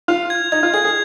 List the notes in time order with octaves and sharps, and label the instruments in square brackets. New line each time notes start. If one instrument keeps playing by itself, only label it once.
[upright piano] F4 [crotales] F7
[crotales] G#6
[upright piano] D#4 [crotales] G#6
[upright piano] F4
[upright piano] G#4 [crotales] G#6
[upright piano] G#4